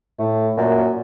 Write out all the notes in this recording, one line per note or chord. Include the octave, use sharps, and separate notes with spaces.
A2 A3
F#2 A#2